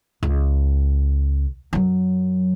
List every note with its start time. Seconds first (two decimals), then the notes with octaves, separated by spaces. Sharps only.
0.23 C#2
1.73 F#2 F#3